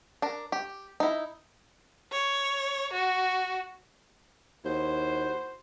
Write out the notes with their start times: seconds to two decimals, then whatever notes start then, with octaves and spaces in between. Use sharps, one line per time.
0.22 D4 A#4
0.52 G4
1.00 D#4 E4
2.12 C#5
2.93 F#4
4.65 D#2 E4 F#4 C5